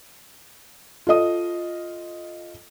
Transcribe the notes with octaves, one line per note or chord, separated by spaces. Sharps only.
F4 A4 D#5 D#6